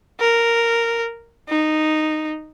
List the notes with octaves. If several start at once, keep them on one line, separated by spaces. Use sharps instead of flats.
A#4
D#4